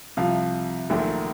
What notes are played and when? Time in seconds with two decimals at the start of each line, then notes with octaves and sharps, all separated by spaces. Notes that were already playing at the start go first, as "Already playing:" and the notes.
0.17 C2 C3 F3 F5
0.90 A#1 G#2 D#3 F#3 A3 E5